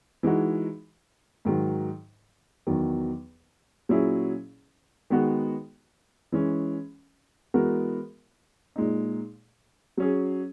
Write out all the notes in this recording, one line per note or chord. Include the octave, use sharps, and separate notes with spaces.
E3 G#3 D#4 F#4
G#2 D#3 F#3
E2 D#3 F#3
A#2 F#3 C#4 E4 G#4
D#3 G#3 B3 F#4
E3 G#3 C#4
E3 G#3 B3 F#4 A#4
A#2 G#3 D#4
F#3 C#4 G#4